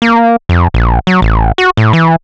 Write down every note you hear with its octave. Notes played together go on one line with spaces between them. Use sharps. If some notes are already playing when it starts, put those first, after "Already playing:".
A#3
F2
A#1
F#3
A1
F#4
A2
E3